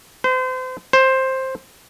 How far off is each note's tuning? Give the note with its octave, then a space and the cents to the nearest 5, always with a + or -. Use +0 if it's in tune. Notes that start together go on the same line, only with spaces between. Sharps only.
C5 -35
C5 +10